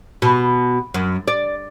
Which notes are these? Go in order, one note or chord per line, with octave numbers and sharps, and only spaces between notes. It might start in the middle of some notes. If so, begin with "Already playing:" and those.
B2
F#2
D5